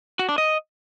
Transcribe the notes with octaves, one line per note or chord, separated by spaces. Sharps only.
F#4
D4
D#5